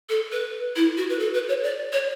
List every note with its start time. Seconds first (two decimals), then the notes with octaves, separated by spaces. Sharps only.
0.09 A4
0.32 B4
0.76 E4
0.97 F#4
1.09 B4
1.19 A4
1.34 B4
1.49 C#5
1.63 D5
1.92 C#5